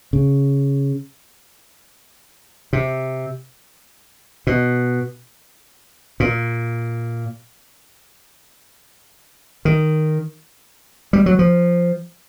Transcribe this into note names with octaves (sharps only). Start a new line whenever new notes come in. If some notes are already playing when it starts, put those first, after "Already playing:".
C#3
C3
B2
A#2
D#3
G3
F#3
F3